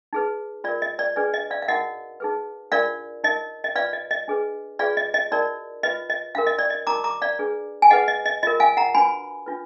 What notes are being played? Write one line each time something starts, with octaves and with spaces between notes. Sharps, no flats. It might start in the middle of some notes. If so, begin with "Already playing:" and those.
D#4 G#4 B4
F4 A#4 D5
D#5
D5
D4 G#4 B4 D5
D#5
D5 F5
F5
D#4 F#4 A#4 D#5 F#5
D#4 G#4 B4
D4 F4 A#4 D5 F5
D#4 A#4 D#5
D#5
F4 B4 D5 F5
D#5
D#5
D4 G#4 B4
F4 G#4 B4 D5 F5
D#5
D#5
D#4 F#4 A#4 D5
F4 B4 D#5
D#5
D4 F#4 A#4 F5
D#5
D5
D#5
D#4 F#4 A#4 A#5 D6
A#5 D6
D5 F5
D4 G#4 B4
G#5
D#4 G#4 B4 D#5 F#5
D#5
D#5
F4 A#4 D#5
F5 G#5
F#5 A#5
D4 F#4 B4 G#5 B5
D4 F4 B4